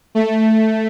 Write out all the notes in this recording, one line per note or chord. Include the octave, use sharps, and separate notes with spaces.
A3